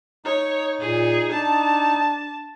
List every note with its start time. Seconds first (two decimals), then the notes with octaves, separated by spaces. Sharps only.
0.25 D#4 C#5
0.81 A#2 G#4
1.32 D4 A5